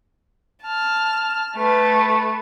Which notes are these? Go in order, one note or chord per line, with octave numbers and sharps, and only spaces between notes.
A5 F6
A3 B4